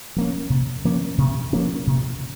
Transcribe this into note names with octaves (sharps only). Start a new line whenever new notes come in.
F3 A#3 C#4
C3
F3 A#3 C#4
C3
F3 A#3 C#4
C3